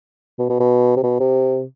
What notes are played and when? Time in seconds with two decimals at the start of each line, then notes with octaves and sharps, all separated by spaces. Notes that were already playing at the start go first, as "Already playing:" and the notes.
0.39 B2
0.49 B2
0.60 B2
0.97 C3
1.04 B2
1.20 C3